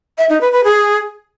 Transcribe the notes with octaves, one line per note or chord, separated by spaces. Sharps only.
E5
D#4
B4
B4
G#4